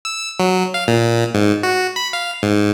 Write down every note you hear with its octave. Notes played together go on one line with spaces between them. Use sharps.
E6
F#3
F5
A#2
G#2
F#4
B5
F5
G#2